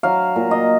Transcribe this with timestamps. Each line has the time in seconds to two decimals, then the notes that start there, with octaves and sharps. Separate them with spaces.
0.03 F#3 F5
0.36 A#2
0.51 D#5